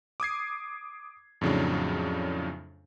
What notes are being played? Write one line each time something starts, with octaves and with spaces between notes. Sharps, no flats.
D6 D#6 G#6 C7
F2 A2 C#3 F#3 D4